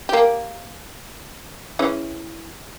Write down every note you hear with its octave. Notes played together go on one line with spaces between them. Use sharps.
A#3 G4
E3 C#4 G#4